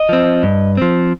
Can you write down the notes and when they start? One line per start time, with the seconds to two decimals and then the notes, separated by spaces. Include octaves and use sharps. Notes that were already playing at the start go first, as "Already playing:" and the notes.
Already playing: D#5
0.09 F3 C4
0.43 G2
0.77 F3 C4